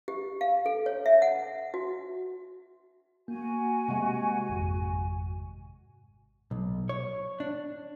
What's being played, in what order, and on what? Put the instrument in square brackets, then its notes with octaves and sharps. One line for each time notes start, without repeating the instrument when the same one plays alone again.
[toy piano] G4
F5
A4
C#5
E5
F#5
F#4
[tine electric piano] A#3 [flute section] F#4 G#5
[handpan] C3 G#3
[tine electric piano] G#1 F2 G#2
[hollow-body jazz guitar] B1
C#5
D4